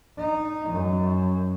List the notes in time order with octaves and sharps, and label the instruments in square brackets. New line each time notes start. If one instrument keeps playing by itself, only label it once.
[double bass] D#4
F#2